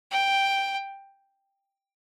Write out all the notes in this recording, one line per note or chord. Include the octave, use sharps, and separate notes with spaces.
G5